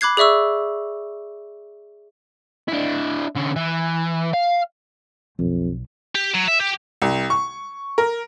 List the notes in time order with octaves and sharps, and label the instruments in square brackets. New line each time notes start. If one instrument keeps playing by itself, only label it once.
[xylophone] B5 D6 F#6 G#6 C7
G#4 D5 E5 C#6 E6
[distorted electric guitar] D4 E4
D3 C#4
E3
F5
[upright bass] B1 [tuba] F2
[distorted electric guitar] G4
F#3
E5
G4
[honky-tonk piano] C2
C#6
A#4